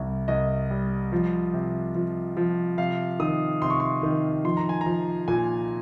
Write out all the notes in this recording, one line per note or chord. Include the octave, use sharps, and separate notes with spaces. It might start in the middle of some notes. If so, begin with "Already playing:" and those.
Already playing: C2 G3
C2 D#5
G3
F3
C3
F3
F3
C3 F5
D#3 D#6
C3 C6
C#6
C6
D#3
F3 C6
A#5
G#5
A#5
F3
A#2 G#5